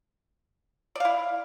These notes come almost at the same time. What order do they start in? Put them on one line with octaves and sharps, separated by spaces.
D5 F5 E4